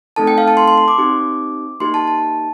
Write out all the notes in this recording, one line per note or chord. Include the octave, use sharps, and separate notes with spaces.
A3 C4 D#4 A4 A5
G5
F5
A5
C6
C6
C6
D6
C4 D#4 G4
A#3 D#4 G4 C6
A5
A5